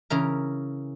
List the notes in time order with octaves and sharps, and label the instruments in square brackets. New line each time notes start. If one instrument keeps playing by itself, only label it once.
[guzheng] C#3 E3 A#4